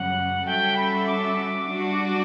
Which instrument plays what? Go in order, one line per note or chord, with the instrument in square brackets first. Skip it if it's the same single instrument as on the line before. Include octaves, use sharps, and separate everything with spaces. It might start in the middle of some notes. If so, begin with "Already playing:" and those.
Already playing: [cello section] F#2 C#3 G3 C#4 [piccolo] F#5
[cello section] G3 C#4 F#4 A4 E5 [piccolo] G5
[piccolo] B5
D6
[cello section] G3 D4 F#4